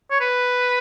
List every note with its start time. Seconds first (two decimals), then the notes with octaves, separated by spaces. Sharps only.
0.11 C#5
0.21 B4